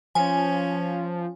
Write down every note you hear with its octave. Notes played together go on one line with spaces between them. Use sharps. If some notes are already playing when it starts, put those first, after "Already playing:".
F3 C#4 G#5